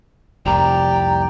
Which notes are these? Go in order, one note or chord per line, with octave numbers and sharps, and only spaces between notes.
F1 C2 G4 D5 G5 A#5